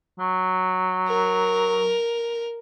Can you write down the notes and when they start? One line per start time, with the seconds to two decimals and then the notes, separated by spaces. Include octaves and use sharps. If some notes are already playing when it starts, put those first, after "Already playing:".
0.19 F#3
1.07 A#4